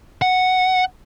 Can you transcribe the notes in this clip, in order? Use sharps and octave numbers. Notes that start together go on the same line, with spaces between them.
F#5